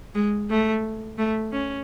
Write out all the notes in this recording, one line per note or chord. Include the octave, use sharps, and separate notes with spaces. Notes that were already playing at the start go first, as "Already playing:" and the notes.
G#3
A3
A3
C#4